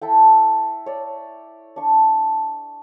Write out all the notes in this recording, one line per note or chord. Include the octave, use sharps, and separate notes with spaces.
E4 A4 G5
C#5 D5
D4 C#6